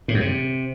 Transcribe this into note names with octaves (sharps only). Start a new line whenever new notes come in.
A2
F#2
C3